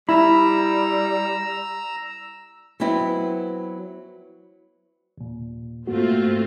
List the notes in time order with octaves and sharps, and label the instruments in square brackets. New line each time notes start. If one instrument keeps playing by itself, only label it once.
[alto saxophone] G3 [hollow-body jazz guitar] E4 [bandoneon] A#5 E6 [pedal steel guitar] B5
[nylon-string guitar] F#3 B3 C4 E4
[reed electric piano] D#2 A#2
[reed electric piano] G#2 A#3 F#4 [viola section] A3 C4 F4